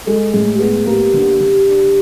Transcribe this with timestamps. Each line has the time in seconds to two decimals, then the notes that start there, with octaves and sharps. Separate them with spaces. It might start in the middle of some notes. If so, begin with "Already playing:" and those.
0.06 G#3 A4
0.33 A2 G#4
0.55 G4
0.60 B3 G#4
0.86 A#3 G4
1.14 D3
1.40 D3
1.67 D4